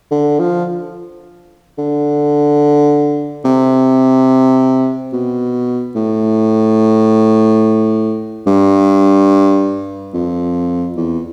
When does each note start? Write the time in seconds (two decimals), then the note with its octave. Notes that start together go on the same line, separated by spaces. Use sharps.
0.11 D3
0.39 F3
1.78 D3
3.45 C3
5.13 B2
5.95 A2
8.47 G2
10.14 F2
10.96 E2